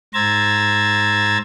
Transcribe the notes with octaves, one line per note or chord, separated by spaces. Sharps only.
G#2 C5 A#5 E6 G#6 A6